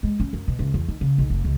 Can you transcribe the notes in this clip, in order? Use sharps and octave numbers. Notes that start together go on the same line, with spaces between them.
G#3
C#4
F#2
B2
C#2
E2
D#3
C#3
B1
F1
C#2